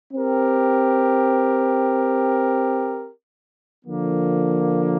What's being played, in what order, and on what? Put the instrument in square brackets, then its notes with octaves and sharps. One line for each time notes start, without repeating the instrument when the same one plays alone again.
[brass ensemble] C4 G4 A#4
D3 F3 A#3